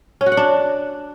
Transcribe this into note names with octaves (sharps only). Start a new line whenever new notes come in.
C#4
F#4
F#5
D4